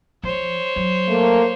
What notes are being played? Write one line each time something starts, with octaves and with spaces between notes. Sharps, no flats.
F3 C5 C#5
F#3
A3 A#3